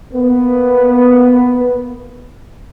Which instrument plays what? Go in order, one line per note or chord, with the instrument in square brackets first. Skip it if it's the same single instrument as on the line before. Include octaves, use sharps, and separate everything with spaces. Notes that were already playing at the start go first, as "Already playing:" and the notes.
[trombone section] A#3 B3